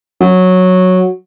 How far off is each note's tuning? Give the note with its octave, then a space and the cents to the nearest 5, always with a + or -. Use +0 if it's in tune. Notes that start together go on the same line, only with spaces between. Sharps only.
F#3 -10